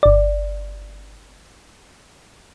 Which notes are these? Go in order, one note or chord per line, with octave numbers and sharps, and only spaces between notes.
G1 D5